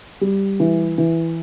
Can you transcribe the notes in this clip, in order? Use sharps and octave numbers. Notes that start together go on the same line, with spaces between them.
G3
E3
E3